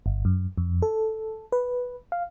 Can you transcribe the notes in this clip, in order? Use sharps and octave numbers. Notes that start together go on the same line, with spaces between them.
G1
F#2
F2
A4
B4
F5